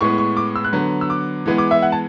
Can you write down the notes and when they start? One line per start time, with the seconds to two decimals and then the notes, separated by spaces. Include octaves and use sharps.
0.01 A2 G#3 B3 C#6
0.18 C#6
0.37 D6
0.56 E6
0.64 F#6
0.73 D3 F#3 B3
1.01 E6
1.10 D6
1.46 E3 G#3 B3
1.58 D6
1.71 E5
1.82 F#5
1.92 A5